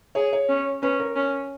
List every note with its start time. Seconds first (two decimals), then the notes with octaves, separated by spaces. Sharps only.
0.15 G#4 C#5
0.33 C#5
0.49 C#4
0.82 C#4 B4
1.00 A#4
1.16 C#4